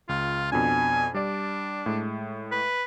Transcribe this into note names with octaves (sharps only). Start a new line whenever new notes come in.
C#2 F4
F2 B2 D4 G#5
G3 D4 D5
A2 G#3
B4